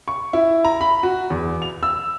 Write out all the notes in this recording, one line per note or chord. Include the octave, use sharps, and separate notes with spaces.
C#6
E4
A#5
B5
F#4
E2
F7
E6